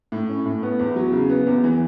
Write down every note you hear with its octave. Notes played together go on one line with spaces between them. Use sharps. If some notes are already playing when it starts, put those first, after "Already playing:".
A2
C#4
A2
B3
E2
F#3
C#3
B3
E2
E3